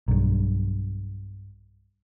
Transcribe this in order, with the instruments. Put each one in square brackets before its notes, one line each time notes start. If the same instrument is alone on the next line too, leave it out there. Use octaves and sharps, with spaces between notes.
[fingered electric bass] B1 G2